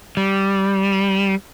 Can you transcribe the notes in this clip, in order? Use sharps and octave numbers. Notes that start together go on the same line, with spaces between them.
G3